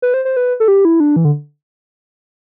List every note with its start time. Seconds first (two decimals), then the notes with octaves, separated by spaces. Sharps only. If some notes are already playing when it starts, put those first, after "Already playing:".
0.02 B4
0.14 C5
0.25 C5
0.37 B4
0.60 A4
0.68 G4
0.85 E4
1.00 D4
1.16 E3
1.25 D3